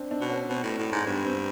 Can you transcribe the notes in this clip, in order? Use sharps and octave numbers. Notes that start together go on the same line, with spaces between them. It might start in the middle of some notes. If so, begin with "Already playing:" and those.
Already playing: C4 D4
C4 D4
B2
B3 C#4
B2 C4
A2
A2
G#2
G2 B3
C4